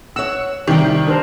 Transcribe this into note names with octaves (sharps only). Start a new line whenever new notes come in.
C#5 F#5 E6
C3 D#3 G3 G4 G5
D4 A#4 C5